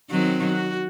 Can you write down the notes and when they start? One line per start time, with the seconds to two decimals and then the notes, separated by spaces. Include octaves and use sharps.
0.10 D#3 F#3 C4
0.51 F#4